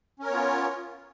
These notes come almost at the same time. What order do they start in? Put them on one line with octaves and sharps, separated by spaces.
C#4 A#4 C#5 B3 F4